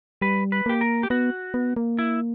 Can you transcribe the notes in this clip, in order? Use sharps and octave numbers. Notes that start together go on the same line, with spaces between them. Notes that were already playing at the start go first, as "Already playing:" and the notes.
G3 B4
B4
A#3 G4
A#4
G4
B3 F#4
B3
A#3
E4